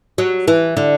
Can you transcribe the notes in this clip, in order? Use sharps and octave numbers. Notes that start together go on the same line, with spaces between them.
F#3
E3
D3